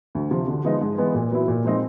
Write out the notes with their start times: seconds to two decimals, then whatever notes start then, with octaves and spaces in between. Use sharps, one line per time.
0.15 D2
0.31 C3 F3
0.48 D3
0.65 F3 G#3 B3 D#4
0.81 G#2
0.98 E3 G#3 B3
1.15 A#2
1.31 F#3 B3 E4
1.48 A#2
1.64 F3 G#3 C4 D#4